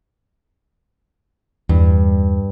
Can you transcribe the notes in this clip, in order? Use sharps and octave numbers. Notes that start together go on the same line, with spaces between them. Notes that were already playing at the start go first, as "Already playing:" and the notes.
E2 G2